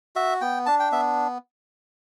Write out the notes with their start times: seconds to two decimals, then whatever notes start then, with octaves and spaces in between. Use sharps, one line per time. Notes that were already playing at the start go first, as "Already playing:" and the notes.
0.16 F#4 E5
0.41 B3 G5
0.66 D4 A5
0.80 G5
0.92 B3 E5